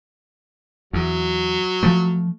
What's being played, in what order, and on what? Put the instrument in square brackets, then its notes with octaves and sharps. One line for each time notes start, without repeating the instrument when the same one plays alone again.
[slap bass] E2 [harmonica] F#3
[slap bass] F3 A3